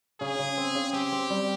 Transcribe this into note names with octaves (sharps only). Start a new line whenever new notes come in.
C#3 G#4
C#3
C4
C#3
C4 G4
C4
G3